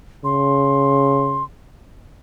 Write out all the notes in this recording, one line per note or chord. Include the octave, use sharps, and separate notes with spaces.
C#3 C6